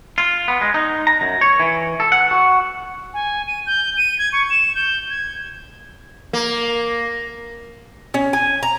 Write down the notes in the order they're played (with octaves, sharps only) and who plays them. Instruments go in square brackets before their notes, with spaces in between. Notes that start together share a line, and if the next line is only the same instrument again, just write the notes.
[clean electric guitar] F4
B3
G#3
D#4
A#5
F#2
C#5
E3
A4
F#5
F#4
[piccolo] G#5
D#7
G6
D#7
G#6
C#6
E7
G6
G#6
[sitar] A#3
[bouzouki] C#4
G#5
A#5